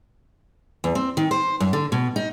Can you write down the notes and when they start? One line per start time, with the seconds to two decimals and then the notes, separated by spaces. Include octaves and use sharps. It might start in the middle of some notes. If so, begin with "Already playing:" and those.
0.84 E2
0.95 C4
1.17 D#3
1.31 C5
1.60 F#2
1.73 D3
1.92 B2
2.16 D#4